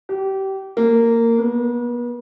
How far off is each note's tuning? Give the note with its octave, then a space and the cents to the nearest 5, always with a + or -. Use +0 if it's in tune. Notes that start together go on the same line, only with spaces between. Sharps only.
G4 -25
A#3 -15
B3 -40